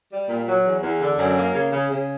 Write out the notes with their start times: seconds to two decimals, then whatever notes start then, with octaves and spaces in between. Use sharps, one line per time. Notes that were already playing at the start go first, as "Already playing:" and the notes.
0.11 G3
0.29 A#2
0.47 F#3
0.65 E2
0.83 E2
1.01 D3
1.19 F#2
1.37 A#3
1.55 C#3
1.73 C#3
1.91 C#3